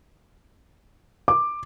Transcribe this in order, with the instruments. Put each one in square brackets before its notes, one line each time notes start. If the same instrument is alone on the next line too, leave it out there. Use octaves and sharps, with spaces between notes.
[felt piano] D6